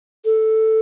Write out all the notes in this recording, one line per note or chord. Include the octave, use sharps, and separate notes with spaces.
A4